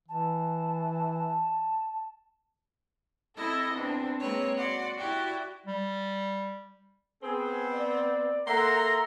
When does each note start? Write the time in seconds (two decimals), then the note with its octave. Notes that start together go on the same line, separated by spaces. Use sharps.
0.08 E3 A5
3.36 C4 E4 A4 D#5
3.73 E2 C4 D4
4.19 G#3 A#3 C4 B4 C#5
4.57 F#4 D5 F#5 C6
4.97 E4 F#4 G4 D5
5.66 G3
7.23 B3 C4 G#4
7.73 D5
8.47 A#3 A4 A#4 E5 F#5 A#5 C6